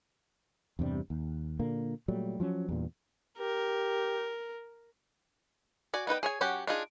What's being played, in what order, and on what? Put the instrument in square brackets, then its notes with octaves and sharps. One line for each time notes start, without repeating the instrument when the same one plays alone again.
[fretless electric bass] E2 G2 C3 G3
D#2
A#2 D3 A#3
A#2 F#3 G3 A3
F3 F#3 C#4
E2 G2 A#2
[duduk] G4 [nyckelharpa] A#4
[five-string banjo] F#4 D5 G#5
B3 D#4 B4 G5
G#4 C#5 G#5
F#3 C#4 F#4 G4 F#5
D4 D#4 F4 G#4